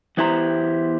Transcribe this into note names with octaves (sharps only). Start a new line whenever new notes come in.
E2 B3 E4 G4 C5 A#5